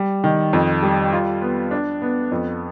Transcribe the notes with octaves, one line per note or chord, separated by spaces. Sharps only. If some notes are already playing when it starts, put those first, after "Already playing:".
Already playing: G3
D#3
F2
G3
F4
B3
D4
B3
F2